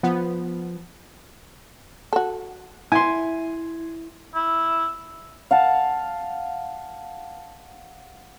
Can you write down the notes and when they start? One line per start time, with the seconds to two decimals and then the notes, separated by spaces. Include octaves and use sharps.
0.03 F3 B3
2.13 F#4 A4
2.92 E4 G#5 C6
4.35 E4
5.51 F5 F#5 A5